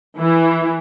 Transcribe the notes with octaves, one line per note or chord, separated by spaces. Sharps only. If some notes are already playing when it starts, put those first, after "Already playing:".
E3